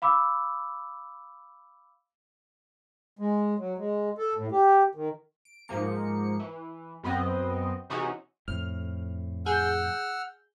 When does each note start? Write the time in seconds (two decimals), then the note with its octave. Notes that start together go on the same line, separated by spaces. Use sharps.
0.02 F5 B5 D6 E6
3.19 G#3
3.58 F#3
3.77 G#3
4.18 A4
4.35 A2
4.51 G4
4.95 D#3
5.45 D7
5.68 G#2 F3 A#3 C#7
6.40 E3
7.03 F#2 B3 C4 D#5
7.90 C3 E3 C#4 D#4 F#4 G#4
8.48 F2 A2 F6
9.46 G#4 F#5 E6 F6 G6